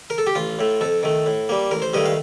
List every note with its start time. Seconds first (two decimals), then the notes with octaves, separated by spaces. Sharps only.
0.10 A#4
0.18 A4
0.27 G4
0.35 A1 F4
0.59 A2 A3
0.81 F2 A4
1.03 D#3 A3
1.26 A2
1.49 G3 A#3
1.71 A1 A#4
1.82 C5
1.94 G2 D#3 A3 D#5
2.06 F5